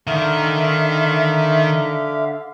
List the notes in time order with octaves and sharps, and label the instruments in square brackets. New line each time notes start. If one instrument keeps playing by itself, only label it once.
[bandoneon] D3 F5 [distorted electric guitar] D#3 A#4 [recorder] E5